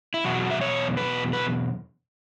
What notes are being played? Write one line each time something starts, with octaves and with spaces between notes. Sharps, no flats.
E4
E2 B2 F#3 F#4
E5
C#5
B4
B4